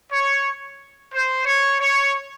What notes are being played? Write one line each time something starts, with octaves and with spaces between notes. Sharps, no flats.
C#5
C5
C#5
C#5